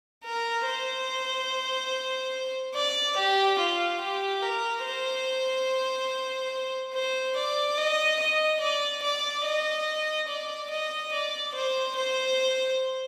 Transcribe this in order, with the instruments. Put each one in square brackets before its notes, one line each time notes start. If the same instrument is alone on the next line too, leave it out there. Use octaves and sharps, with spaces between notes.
[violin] A#4
C5
D5
G4
F4
G4
A#4
C5
C5
D5
D#5
D#5
D5
D5
D#5
D5
D#5
D5
C5
C5